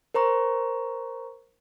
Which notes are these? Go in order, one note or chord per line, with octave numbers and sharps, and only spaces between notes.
A#4 C5 A#5 C#6